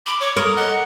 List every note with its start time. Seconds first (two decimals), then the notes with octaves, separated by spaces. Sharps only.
0.06 B5 D6
0.20 C#5 D6
0.36 A#4 C#6 D#6
0.56 D#5 F#5